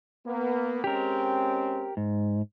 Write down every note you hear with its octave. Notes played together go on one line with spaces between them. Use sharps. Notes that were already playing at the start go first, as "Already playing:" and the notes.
A#3 B3
G#3 C4 C#4 G4 A#4
G#2